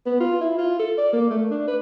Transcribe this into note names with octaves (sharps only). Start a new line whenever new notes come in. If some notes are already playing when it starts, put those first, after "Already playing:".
B3
F4
E4
F4
A4
D5
A#3
A3
D4
B4